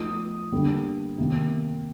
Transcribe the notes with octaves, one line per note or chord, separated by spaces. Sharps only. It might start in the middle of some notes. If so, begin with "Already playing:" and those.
Already playing: F3 A3 D#4 D#6
D3 G3 A#3
C3 D#3 A#3